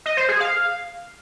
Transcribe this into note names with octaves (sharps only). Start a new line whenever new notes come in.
D#5
C5
G#4
F5